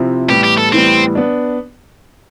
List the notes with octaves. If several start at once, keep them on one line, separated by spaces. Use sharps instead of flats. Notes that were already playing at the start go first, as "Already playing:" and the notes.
Already playing: C3 F3 C4 E4
A2 E3 G3 B3 G4
G4
A4
A2 E3 G3 B3 C4
B3 D4